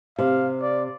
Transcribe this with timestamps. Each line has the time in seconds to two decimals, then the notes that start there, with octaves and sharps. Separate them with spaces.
0.19 C3 F5
0.62 D5